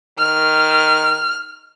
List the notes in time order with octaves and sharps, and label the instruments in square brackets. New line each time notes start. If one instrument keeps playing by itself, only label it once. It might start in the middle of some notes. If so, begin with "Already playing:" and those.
[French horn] D#3 [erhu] F6